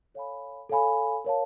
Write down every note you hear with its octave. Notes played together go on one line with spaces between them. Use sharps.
A4 C#5 F5 G#5 B5
A4 C#5 F5 G#5 B5
A#4 C#5 F5 A5